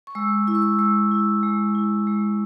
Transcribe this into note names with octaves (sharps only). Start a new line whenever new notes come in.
C#6
G#3 E6
E4 E6
C#6
E6
G#3 E6
E4
G#3
E4
G#3